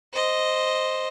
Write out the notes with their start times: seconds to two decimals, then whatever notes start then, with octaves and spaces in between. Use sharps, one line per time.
0.13 C5 D#5